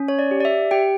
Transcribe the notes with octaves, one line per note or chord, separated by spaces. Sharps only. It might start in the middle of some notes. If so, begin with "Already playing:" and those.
Already playing: C#4
C#5
D5
G4
D5
E5
G4 G5